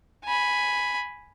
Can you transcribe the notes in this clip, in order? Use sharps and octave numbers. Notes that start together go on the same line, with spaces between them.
G#5 B5